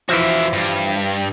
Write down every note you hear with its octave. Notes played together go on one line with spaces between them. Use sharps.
E3 F3 F#4 E5
G2